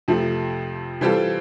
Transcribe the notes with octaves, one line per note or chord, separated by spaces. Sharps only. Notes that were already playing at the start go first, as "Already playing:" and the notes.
F2 C3 F3 A3
E3 G3 C4 F4 A4